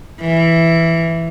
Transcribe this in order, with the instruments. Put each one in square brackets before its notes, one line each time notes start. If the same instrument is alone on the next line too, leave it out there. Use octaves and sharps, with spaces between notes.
[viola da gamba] E3